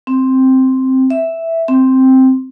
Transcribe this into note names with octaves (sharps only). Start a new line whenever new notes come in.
C4
E5
C4